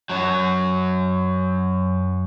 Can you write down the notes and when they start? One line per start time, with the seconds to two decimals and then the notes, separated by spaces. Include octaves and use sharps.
0.10 F#2 F#3